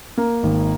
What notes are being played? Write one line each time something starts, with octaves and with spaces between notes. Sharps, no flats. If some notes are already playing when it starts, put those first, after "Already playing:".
A#3 A#4
G#1 G#2 D#3